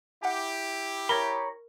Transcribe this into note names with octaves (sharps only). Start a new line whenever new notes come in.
E4 G4 F#5 G#5
A#4 C#5 A#5 B5